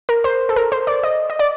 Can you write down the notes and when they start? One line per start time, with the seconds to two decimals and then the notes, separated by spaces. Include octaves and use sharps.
0.09 A#4
0.24 C5
0.49 A4
0.56 A#4
0.72 C5
0.87 D5
1.03 D#5
1.30 D#5
1.39 D5